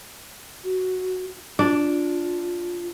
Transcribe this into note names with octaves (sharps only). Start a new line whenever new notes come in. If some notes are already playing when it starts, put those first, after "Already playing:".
F#4
D4 F4